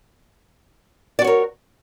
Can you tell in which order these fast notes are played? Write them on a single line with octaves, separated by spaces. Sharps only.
D5 F#4 C#5 A#4